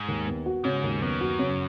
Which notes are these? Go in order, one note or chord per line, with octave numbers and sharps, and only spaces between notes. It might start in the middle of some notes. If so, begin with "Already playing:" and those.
Already playing: G#2
D#2
B3
F#4
G#2 C#3
D#2
F#2 B3
F#4
C#3